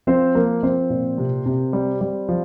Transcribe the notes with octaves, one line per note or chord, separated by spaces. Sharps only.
F3 C4 C5
F3 A#3 A#4
F3 C4 C5
A#2
C3
C3
G3
G3
F3